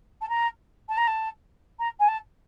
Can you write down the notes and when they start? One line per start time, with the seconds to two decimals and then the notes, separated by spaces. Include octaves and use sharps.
0.21 A5
0.29 A#5
0.89 A5
0.97 A#5
1.07 A5
1.79 A#5
1.99 G#5
2.08 A5